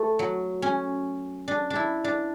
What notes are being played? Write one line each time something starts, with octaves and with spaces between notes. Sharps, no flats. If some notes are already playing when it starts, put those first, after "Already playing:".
Already playing: A3
F#3
C#4
D4
D4
E4
D4